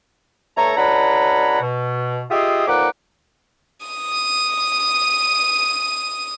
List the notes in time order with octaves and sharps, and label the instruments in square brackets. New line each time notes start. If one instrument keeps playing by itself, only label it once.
[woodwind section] G2 A3 A4 C#5 A#5
C#2 D4 C#5 F#5 A#5 B5
B2
F4 G4 G#4 D#5 E5 D#6
F2 A#2 D#4 B4 F#5 D6
[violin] D#6 D#7